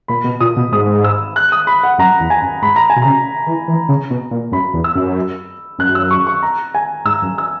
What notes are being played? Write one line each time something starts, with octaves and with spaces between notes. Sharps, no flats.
A#2 B5
B2
A#2 D#6
B2
G#2 D#6
E6
F#6
D#6
B5
F#5
F#2 A#5
E2
G#5
F#2
G#2 B5
A#5
G#5
B2
C#3 A#5
E3
E3
C#3
B2
A#2
F#2 B5
E2
E6
F#2
F#2 F#6
E6
C#6
C#6
A#5
G#5
G#2 E6
F#2
E6